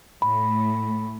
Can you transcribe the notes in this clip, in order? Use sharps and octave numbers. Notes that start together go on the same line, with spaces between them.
A2 A3 B5